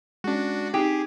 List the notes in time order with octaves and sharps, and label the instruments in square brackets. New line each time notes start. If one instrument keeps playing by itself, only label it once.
[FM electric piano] G#3 C#4 [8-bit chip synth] D4 F#4
[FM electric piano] C4 D#4 C7 [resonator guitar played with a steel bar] G4 [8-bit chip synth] G#4